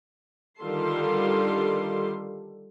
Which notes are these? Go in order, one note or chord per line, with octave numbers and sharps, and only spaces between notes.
D3 D#3 G3 F4 A4 C6